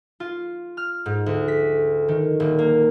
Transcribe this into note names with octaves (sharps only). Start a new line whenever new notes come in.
F4
F6
G#2
D2
B6
D#3
D#1
A#3